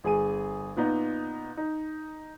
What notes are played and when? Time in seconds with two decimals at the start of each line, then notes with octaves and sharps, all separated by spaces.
0.04 G1 G#4 G#5 D#7
0.76 A#2 B3 D#4 D#5
1.57 D#4